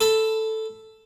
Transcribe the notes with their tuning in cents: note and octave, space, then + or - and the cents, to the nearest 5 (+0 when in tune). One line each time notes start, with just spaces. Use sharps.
A4 +0 B5 +15